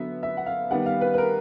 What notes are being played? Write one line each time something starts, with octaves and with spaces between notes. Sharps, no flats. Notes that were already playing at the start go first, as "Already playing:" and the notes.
Already playing: D3 F#3 B3 E5
E5
F#5
F5
D#3 G3 B3 F#5
F5
B4
B4
A#4